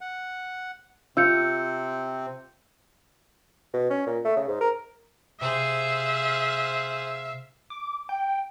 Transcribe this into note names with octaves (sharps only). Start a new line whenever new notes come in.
F#5
C3 C4 F4 E6 G6 C#7
B2
C#4
A#2
A3
C#3
G#2
A#4
C3 G#4 C5 E5 F5
D6
G5